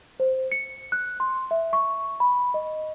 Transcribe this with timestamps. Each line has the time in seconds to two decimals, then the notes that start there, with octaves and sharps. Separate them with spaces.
0.20 C5
0.52 C#7
0.92 F#6
1.20 C6
1.51 E5
1.73 C#6
2.20 B5
2.54 D#5